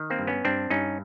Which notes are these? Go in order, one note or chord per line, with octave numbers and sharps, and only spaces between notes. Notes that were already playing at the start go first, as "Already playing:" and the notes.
Already playing: D#3
A#3 C4
G2
B3 C#4
G2 C4 D4
G2 C#4 D#4